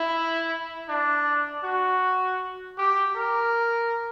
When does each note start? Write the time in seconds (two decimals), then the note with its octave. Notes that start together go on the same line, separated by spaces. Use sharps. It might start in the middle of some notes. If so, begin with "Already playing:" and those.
Already playing: E4
0.89 D4
1.64 F#4
2.78 G4
3.16 A#4